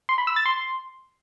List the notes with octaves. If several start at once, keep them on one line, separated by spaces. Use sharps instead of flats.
C6
B5
E6
A6
C6